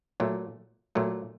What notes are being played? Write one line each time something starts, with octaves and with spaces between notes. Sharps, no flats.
A#2 F#3 A3
A#2 F#3 A3